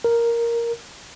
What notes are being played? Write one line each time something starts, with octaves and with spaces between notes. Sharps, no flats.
A#4